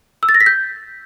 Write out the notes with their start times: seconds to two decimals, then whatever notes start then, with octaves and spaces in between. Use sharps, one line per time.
0.23 E6
0.29 A6
0.35 A#6
0.40 B6
0.46 G6